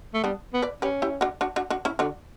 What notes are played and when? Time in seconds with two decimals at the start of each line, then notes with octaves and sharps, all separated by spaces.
0.14 A3
0.24 G3 B3 D4
0.53 B3
0.62 B4 D5
0.82 C#4 G4 B4
1.02 E4 G4
1.21 D4 F#4
1.41 D4 F#4
1.56 D4 F#4
1.70 D4 F#4
1.85 C#4 E4
1.99 D3 D4 F#4